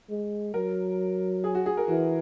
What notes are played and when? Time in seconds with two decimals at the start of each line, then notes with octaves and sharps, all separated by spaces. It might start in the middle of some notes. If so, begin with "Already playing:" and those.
0.10 G#3
0.54 F#3 A#4
1.44 G#4
1.54 F#4
1.66 G#4
1.77 A#4
1.88 E3 F#4